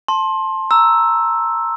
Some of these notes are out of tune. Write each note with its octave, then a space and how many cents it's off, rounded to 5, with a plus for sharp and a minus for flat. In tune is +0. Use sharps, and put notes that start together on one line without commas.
A5 +0 C6 +20
A#5 +0 E6 +0